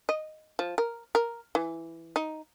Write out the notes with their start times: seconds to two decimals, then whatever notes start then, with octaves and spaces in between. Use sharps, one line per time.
0.09 D#5
0.59 F3
0.78 A#4
1.15 A#4
1.55 E3
2.16 D#4